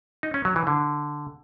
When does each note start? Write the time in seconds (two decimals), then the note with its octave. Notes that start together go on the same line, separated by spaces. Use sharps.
0.23 D#4
0.34 C#4
0.45 F#3
0.56 E3
0.67 D3